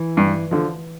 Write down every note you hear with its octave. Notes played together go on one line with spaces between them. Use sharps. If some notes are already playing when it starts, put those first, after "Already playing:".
Already playing: E3
G2
D3 F3